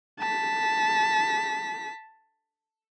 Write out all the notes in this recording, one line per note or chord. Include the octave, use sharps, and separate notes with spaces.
A5 B6